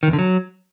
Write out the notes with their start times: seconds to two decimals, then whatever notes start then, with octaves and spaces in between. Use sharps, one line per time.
0.03 D#3
0.08 E2
0.13 D3
0.19 F#3